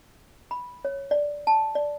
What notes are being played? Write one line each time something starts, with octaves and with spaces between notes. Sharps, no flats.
B5
C#5
D5
A5
D5